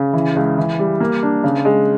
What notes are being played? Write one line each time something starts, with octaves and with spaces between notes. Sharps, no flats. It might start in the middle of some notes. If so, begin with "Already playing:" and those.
Already playing: C#3
E3
C#2
E3
G3
A#3
D4
C#3
G#3